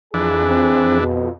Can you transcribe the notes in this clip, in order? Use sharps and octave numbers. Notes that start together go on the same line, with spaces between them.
F2 E3 D4 G#4
C4
B2